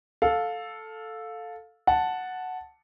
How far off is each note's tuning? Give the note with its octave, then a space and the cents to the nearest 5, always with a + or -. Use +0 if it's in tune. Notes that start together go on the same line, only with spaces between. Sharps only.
A4 +0 F5 +15
F#5 +0 A5 +0